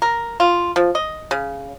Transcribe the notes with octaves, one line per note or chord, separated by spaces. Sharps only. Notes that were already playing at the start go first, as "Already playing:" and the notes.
A#4
F4
F3
D#5
C#3